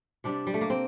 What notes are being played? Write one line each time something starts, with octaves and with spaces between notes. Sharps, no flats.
C3 G3 D4
G3
A3
A#3
C4